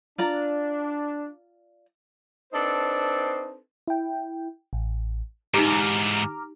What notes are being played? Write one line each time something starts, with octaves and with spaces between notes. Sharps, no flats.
D4 F4 D5 A#5
C4 D4 D#4 A4 B4 C5
E4 G5
A1
G#2 E3 D#4 G4 A#5 D6 F6